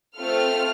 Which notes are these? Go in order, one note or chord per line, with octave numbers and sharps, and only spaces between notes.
A3 C4 F4 A4 F6